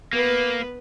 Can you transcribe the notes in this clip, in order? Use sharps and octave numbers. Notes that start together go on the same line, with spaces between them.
A#3 B3 B4